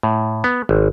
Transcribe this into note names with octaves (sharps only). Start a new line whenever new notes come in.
A2
B3
G#1